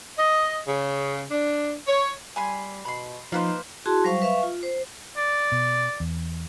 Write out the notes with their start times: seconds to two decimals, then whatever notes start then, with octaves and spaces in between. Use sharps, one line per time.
0.18 D#5
0.67 C#3
1.31 D4
1.87 C#5
2.36 G3 G#5 B5 C6
2.85 B2 B5 C6
3.32 F3 A#3 D#4 B4 C5
3.86 E4 F#4 G#4 A5 C6
4.04 F#3 G3 C5 F5 C#6
4.22 B4 E5 F5 C#6
4.43 F4
4.63 C5
5.17 D5
5.52 B2
6.00 E2